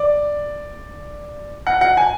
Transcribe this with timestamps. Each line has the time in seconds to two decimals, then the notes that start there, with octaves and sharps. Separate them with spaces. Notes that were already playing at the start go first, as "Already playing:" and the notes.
Already playing: D5
1.67 F#5
1.81 F#5
1.97 G#5